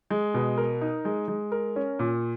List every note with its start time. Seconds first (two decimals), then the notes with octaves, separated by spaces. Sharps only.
0.11 G#3
0.34 B2
0.57 A#4
0.81 D#4
1.05 G#3
1.28 G#3
1.52 A#4
1.76 C#4
1.99 A#2